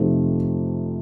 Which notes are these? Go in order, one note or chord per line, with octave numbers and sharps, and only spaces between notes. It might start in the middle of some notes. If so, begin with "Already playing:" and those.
Already playing: F2 C3 F3 A3 D#4